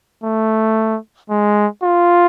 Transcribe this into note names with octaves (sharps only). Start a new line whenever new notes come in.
A3
G#3
F4